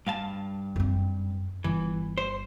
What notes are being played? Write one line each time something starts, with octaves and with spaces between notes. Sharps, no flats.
G2 F5 A5
F#2 C4
G1 E3
C5